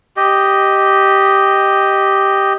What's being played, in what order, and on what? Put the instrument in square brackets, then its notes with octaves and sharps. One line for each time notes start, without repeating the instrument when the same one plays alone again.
[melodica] G4 D#5